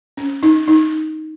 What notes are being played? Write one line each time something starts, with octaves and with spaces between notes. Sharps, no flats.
C#4
D#4
D#4